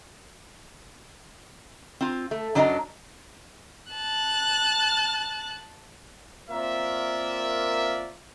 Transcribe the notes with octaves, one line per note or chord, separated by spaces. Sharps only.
C4 F4
A3
F#2 F#3 D4 D#5 A5 A#5
A5 F#6
A#3 C4 F4 A#4 D5 E5